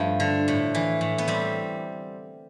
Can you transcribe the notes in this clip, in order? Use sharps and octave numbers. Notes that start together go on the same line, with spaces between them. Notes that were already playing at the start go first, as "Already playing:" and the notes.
Already playing: G2 F3 A3
D3
A2
E3
A2
B3
G3 C4